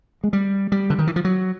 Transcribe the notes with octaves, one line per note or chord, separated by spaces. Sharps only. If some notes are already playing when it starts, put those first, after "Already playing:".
G#3
G3
G3
D3
D#3
E3
F3
F#3